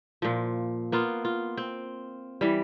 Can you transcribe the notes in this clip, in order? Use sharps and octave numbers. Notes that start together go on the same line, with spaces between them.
A#2 F3
A#3 B3 F4
F4
C4
E3 G3